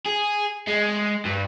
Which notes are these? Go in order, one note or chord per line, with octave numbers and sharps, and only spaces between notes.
G#4
G#3
G2